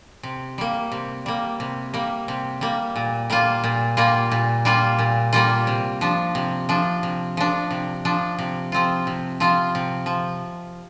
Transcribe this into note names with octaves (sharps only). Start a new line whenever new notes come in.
C3
G3 A#3
C3
G3 A#3
C3
G3 A#3
C3
G3 A#3
A#2
G3 A#3 F4
A#2
G3 A#3 F4
A#2
G3 A#3 F4
A#2
G3 A#3 F4
C3
F3 D4
C3
F3 D4
C3
F3 D4
C3
F3 D4
C3
F3 C4 F4
C3
F3 C4 F4
C3
F3